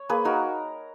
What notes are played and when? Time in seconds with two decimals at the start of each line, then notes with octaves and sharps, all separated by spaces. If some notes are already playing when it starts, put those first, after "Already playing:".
Already playing: C#5
0.09 A#3 G#4 B4
0.25 D#4 F#4 A#4